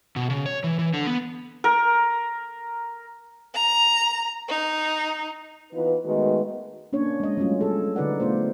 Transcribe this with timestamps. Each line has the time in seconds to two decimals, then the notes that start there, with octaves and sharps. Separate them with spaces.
0.16 B2
0.30 C#3
0.46 C#5
0.64 E3
0.79 E3
0.94 D3
1.07 B3
1.64 A#4
3.55 A#5
4.49 D#4
5.73 E3 B3 D#4 F4 B4
6.05 D#3 G#3 A3 B3 F#4 B4
6.93 A#3 C#4 D4 C#5
7.20 G#3 D#5
7.37 F#3 G3 A3 C#4 F4
7.61 G#4 A4
7.96 D3 D#4 B4 D5 F#5
8.20 A3 B3 F4 C5